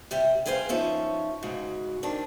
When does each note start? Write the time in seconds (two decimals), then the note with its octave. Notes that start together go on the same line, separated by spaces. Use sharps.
0.11 C3 G3 G4
0.46 G3 G#4 B4 C5 D5 F5
0.69 F3 C#4 D#4 E5
1.42 G#2 C#3 F#4
2.03 D#3 C4 D4